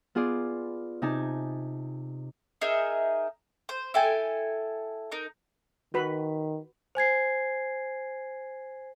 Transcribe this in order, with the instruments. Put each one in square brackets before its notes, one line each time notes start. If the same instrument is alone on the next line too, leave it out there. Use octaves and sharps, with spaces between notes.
[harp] B3 F4 G#4 D5
C3 D#4 G#5 A5
[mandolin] D#4 G#4 A#4 E5
C5
E4 A4 G5 G#5
D#4 A#4
[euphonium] D#3 [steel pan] F#4 B4 B5
[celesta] C5 G#5 G#6 C7